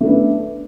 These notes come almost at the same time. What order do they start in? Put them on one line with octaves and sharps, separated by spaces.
A3 D4 B3